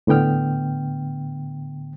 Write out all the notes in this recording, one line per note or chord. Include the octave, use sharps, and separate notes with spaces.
A2 D3 B3 G5 F6